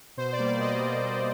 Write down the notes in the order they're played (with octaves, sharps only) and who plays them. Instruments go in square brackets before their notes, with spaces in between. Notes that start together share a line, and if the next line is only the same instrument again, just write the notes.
[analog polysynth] B2 C5
D5
G3 A#3
D5
B2 D#5
G3 A#3
B2